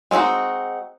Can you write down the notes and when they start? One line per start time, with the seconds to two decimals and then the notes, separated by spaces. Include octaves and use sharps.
0.11 G#3 B3 C4 D#4 F#4